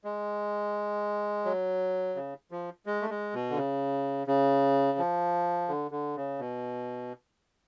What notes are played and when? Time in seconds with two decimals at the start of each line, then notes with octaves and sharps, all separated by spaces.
0.05 G#3
1.45 F#3
2.15 C#3
2.51 F3
2.86 G#3
3.02 A3
3.10 G#3
3.34 B2
3.50 D3
3.56 C#3
4.27 C#3
4.98 F3
5.68 D3
5.91 D3
6.16 C#3
6.39 B2